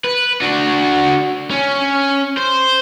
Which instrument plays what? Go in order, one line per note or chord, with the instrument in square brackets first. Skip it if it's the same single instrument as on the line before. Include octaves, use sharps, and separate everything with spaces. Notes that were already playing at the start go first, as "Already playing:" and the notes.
[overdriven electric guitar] B4
D4 F#4
C#4
C5